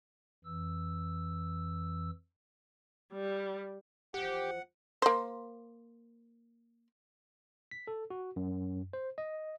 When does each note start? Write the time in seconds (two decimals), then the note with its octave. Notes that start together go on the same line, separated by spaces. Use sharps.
0.44 F2 E3 E6
3.12 G3
4.14 E2 F3 G4 F#5
5.02 A#3 C5
7.71 B6
7.87 A4
8.10 F#4
8.36 F#2
8.93 C5
9.18 D#5